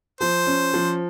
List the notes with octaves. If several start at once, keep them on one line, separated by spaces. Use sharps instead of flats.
F3 C5
C#4
F3